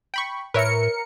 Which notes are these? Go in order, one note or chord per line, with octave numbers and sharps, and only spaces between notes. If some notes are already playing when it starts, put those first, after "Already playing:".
G5 B5 C#6
A2 A#4 B4 C#5 E5 C#7